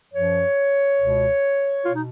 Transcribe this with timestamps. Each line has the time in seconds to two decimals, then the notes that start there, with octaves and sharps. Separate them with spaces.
0.13 F#2 F3 C#5
0.99 C#2 B2
1.86 B2 F4
1.92 D#4